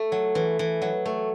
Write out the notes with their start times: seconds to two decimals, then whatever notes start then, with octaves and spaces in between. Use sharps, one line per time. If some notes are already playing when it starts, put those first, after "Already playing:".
Already playing: A3
0.12 F#3
0.35 E3
0.59 E3
0.82 F#3
1.06 A3